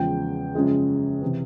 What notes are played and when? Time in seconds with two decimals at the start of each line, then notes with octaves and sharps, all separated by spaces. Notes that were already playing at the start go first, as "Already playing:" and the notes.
Already playing: E2 C#3 F3 G#3 G5
0.55 F#2 C#3 F3 G#3
1.21 C3 E3